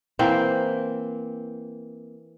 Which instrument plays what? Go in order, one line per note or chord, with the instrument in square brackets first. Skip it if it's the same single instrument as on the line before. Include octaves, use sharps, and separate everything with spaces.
[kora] E3 A#3 C4 C5